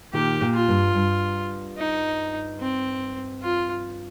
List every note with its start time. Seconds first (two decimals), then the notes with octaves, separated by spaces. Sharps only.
0.13 A#2 D#3 G4
0.41 A#2
0.55 F4
0.68 G2
0.95 G2
1.78 D#4
2.60 C4
3.42 F4